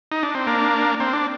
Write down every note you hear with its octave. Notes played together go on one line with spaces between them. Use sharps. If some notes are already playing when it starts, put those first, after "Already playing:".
D#4
D4
C4
A#3 D4
C4
D4